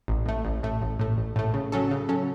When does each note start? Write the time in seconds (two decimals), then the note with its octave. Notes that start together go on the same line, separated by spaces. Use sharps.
0.08 A1
0.26 A2 A3
0.45 A1
0.63 A2 A3
0.82 A1
0.99 A2 A3
1.17 A1
1.36 A2 A3
1.54 C#3
1.72 F#3 C#4 A4
1.91 C#3
2.09 F#3 C#4 A4